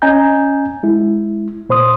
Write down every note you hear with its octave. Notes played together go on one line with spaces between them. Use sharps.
C#4 D#5 G#5 A#5 G6
G#3 E4
A#2 C5 C6 D#6